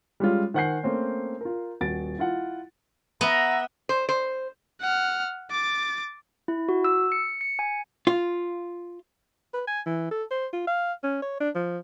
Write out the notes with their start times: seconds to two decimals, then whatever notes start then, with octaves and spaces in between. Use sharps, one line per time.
0.20 G3 G#3 C#4 F4
0.54 D#3 C5 F#5 G#5 G6 C7
0.83 A3 A#3 C4 C#4
1.41 F4 A#4
1.81 D#1 F#4 A6 D7
2.19 E4 F4 F#5
3.21 B3 E5 A#5
3.89 C5
4.09 C5
4.81 F#5 F6
5.51 D6 A6
6.48 E4
6.69 F#4
6.85 E6
7.12 C#7
7.41 C#7
7.59 G#5
8.07 F4
9.54 B4
9.67 G#5
9.86 E3
10.11 A4
10.31 C5
10.53 F4
10.67 F5
11.03 C#4
11.22 C#5
11.40 D4
11.55 F3